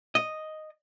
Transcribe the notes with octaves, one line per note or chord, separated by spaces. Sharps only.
D#5